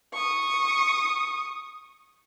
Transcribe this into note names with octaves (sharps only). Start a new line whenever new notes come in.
C#6 D#6